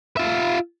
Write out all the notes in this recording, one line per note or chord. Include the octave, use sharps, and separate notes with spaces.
F4 E5